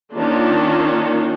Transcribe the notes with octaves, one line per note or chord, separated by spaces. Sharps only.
D#3 A#3 C#4 D4 F4